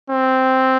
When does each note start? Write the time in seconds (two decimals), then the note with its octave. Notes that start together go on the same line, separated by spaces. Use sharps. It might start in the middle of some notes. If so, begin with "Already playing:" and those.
0.10 C4